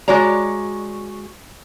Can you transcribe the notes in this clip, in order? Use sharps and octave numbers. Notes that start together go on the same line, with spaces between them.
G#3 F#4 C#5 D5 A#5